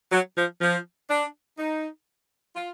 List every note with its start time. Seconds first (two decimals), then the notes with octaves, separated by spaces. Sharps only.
0.12 F#3
0.36 F3
0.61 F3
1.09 D4
1.58 D#4
2.55 F4